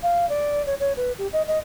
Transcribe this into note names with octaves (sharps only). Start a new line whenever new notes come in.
F5
D5
C#5
C#5
B4
G4
D#5
D#5